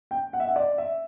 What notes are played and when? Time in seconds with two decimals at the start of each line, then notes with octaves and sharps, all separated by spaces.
0.11 G5
0.33 F#5
0.40 E5
0.48 F#5
0.56 D5
0.78 E5